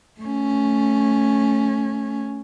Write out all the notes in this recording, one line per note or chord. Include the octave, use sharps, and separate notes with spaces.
A3 C#4